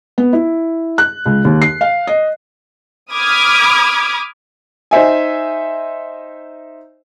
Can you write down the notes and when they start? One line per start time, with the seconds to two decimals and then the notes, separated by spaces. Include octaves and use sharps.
0.18 B3
0.33 E4
0.98 F#6
1.26 C#2
1.45 D#2
1.62 C7
1.81 F5
2.07 D#5
3.13 B5 D6 D#6 F6 G#6
4.91 D#4 C5 E5 G#5